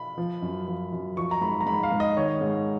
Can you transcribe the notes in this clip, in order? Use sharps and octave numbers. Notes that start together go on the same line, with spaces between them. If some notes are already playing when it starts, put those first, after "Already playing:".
Already playing: B5
F3
F#2
F3
F#2
F3 C#6
A#5
G#2 B5
A#5
G#2 B5
F5
G#2
D#5
D#3 C#5
G#2